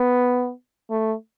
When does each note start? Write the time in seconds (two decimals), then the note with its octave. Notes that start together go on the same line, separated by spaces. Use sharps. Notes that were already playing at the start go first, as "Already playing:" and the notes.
Already playing: B3
0.90 A3